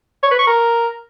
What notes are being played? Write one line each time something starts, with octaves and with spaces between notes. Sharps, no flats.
C#5
B4
C#6
A#4